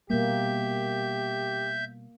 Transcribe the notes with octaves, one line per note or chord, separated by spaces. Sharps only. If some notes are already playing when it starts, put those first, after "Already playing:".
B2 G3 A#3 G4 E5 G6